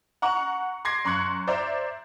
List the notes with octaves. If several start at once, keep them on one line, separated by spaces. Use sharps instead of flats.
F#5 A#5 C#6
C6 D6 G#6 A#6 C7
F#2 C6 C#6 F#6 G#6 C#7
C5 D5 E5 A#5